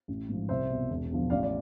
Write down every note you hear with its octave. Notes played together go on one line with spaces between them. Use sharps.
A1
G#2 F3
C2 C5 E5
B2
E1
E2 D3 F3
A1 D5 F5
D5